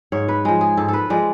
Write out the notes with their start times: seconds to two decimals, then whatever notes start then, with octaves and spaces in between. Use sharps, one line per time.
0.12 G#2 C#5
0.28 B4
0.45 F3 G#3
0.61 G#4
0.77 G#2 A4
0.88 A4 B4
1.10 F3 G#3 D5